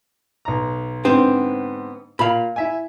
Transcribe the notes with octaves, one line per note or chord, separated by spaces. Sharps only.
B1 A#5
G#2 D3 B3 C4 C5
A#2 F5 B5
E4 E5 G#5